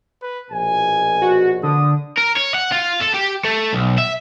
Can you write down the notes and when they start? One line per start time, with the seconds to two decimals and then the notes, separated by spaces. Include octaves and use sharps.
0.22 B4
0.51 A#1 B2 G#5
1.22 F#4
1.63 D3 D#6
2.17 A#4
2.37 C#5
2.54 F#5
2.72 F4
3.01 A4
3.14 G4
3.45 A3
3.73 B1
3.98 E5